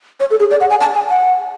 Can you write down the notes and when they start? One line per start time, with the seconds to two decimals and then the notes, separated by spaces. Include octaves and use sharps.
0.20 C#5
0.31 A4
0.40 G#4
0.51 D5
0.60 F#5
0.70 G#5
0.81 A5
0.95 G#5
1.09 F#5